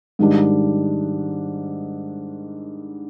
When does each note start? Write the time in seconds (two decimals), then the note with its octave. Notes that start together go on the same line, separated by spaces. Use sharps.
0.19 G#2 D#3 G3 D4